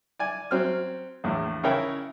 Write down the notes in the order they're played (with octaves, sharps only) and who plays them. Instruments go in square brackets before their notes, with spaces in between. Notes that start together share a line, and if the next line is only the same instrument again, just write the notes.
[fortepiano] D5 G#5
F#3 C4 F6
A#1 E2 A2
C#3 E4 A#4 C#5 G5